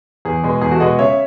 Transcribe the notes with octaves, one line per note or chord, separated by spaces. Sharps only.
E2 G#4
B2 G#3
E2 G#4
F#4 A4
B2 G#3 D#5 F#5
C#3 C#5 E5